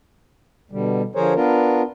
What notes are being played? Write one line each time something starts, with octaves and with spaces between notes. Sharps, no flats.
B2 D3 G3
D3 F3 G#4 A#4 C5 C#5
B3 D4 F4 A#4